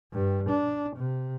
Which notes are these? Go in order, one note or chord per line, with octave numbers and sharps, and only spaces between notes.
G2
D4
C3